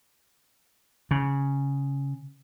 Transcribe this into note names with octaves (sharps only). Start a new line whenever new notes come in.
C#3